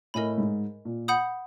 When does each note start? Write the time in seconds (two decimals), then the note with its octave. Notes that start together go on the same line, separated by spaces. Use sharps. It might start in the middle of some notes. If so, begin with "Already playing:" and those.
0.14 A2 A#4 D#5 G#5 B5
0.38 G#2
0.85 A#2
1.08 F#5 B5 D#6 G6